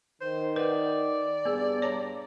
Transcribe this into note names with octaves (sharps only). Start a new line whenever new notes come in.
D#3 C5
B4 D5 F#5
G2 B3 G#4
G2 C#5 A5 A#5